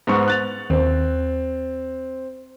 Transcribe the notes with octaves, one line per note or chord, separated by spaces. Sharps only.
G#2 B3 C#6
F#6 A6 F7
D#2 C4